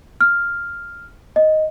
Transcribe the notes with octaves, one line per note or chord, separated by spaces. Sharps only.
F6
D#5